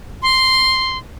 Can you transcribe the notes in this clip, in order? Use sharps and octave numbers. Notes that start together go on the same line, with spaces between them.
C6